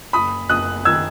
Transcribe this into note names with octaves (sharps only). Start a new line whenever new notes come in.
F#1 B5 D#6
F#1 D#6 F#6
D#3 E6 G#6